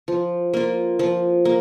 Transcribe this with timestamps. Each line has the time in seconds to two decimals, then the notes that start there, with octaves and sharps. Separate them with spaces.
0.08 F3
0.54 A#3 F4
0.99 F3
1.45 A#3